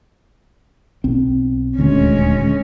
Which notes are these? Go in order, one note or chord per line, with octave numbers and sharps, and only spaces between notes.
B1 C4
D#1 D2 D3 G#3 C#4